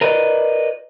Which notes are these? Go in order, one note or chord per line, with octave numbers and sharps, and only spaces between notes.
A#4 B4 D5 D#5